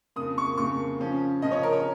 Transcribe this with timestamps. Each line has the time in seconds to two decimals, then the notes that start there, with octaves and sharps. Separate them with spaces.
0.16 F2 C#3 A#3 D#6
0.38 C#6
0.57 F2 C#3 A#3 C#6
1.00 C#3 F3 C#4
1.42 C#3 F3 C#4 D#5
1.52 C#5
1.63 A#4
1.72 C#5